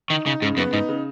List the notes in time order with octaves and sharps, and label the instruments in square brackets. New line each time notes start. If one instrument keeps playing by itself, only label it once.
[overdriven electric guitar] D#3 [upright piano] D#4
[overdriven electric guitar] C#3 [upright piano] D#4
[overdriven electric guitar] G#2 [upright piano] C#3
[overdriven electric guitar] F#2 [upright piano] B3
[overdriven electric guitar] G#2 [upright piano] D#4
[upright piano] C#3